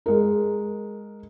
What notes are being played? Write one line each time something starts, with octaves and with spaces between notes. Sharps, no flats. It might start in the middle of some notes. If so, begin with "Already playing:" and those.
G#3 A#4